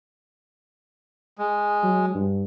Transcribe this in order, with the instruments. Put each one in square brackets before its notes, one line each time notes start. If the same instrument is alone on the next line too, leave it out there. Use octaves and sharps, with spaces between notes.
[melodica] G#3
[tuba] F#3
G2